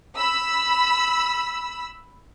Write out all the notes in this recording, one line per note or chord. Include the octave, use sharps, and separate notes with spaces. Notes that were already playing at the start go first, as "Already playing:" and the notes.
B5 E6